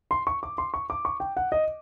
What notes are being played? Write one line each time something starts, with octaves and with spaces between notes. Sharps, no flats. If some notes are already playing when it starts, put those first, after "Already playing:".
C6
C#6
D6
C6
C#6
D6
C#6
G5
F#5
D#5